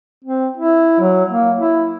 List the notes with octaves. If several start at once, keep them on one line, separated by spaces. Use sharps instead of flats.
C4
E4
F#3
A#3
E4